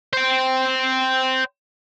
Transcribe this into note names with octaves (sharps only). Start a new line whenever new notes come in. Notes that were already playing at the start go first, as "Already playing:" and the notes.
C5 G5